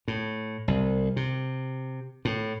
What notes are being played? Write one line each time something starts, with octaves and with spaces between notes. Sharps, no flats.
A2
C2
C3
A2